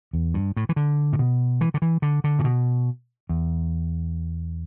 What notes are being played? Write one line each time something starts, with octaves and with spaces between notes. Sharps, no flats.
E2
G2
A2
E3
D3
A2
B2
E3
D3
E3
D3
D3
A2
B2
E2